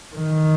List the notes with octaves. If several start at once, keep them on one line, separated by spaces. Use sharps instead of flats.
D#3